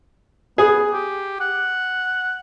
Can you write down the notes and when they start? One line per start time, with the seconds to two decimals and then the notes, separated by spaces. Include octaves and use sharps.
0.58 B3 G#4
0.93 G4
1.41 F#5